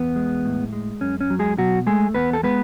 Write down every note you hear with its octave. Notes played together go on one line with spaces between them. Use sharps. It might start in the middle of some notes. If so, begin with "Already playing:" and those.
Already playing: E2 B3
G#3
A2
G#3
F#2 C#4
C#4
F#3
G#3 G#4
B2 F#3 F#4
G#3 A3 G#4
E2 B3 B4
A4
G#3 B3 B4